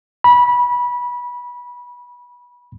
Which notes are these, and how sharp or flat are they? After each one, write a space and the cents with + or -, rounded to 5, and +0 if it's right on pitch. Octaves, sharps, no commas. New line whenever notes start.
B5 -20